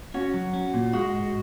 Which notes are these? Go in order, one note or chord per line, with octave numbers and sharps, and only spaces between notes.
C#4 F#4
F#3
C#4
A#2
G#3 F#4
G#2